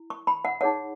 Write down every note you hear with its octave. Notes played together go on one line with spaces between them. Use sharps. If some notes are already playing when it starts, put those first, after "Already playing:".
Already playing: E4
C#6
B5
F#5
D#4 G#4 C#5 F#5